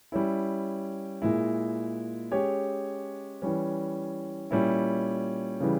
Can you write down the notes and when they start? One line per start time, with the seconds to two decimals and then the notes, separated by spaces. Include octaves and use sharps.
0.12 G3 C#4 E4
1.22 A#2 G#3 E4
2.32 G#3 C#4 G4 C#5
3.42 E3 G3 C#4
4.51 A#2 G3 C#4 E4
5.61 C#3 E3 G3